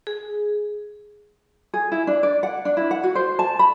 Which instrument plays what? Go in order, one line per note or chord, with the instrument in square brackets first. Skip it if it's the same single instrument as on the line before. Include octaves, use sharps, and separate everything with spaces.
[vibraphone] G#4
[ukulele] G#4
E4
D4
D5
F#5
D4
E4
F#5
F#4
C5
A5
B5